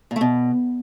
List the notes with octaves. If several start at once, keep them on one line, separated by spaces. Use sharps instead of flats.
A#2
A3
B2